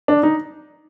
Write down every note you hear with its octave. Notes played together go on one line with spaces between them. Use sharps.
D4
D#4